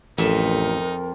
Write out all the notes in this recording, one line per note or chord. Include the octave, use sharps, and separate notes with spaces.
A1 F2 D#4 A#4 E5